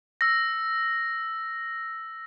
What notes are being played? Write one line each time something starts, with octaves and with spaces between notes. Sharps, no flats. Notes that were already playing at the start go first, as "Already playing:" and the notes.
E6 A#6